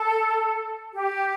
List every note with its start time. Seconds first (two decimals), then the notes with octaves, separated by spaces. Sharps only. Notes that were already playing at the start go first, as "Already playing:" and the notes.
Already playing: A4
0.94 G4